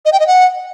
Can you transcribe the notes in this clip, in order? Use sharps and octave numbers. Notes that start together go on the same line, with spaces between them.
D#5
G5
D#5
F#5